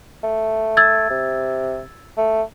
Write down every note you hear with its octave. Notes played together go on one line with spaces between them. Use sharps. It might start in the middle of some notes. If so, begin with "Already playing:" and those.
A3
E6 G#6 A6
C3
A3